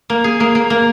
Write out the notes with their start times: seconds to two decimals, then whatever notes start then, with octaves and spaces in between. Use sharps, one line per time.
0.10 A#3
0.24 G#4
0.40 A#3
0.55 A#3
0.70 A#3